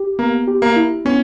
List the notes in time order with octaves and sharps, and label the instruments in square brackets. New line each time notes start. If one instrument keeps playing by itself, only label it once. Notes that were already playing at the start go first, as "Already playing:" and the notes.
Already playing: [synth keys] G4
[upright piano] A#3 [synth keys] B3
[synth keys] G4
[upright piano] A#3
[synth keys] E4
[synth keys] B3 [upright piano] C#4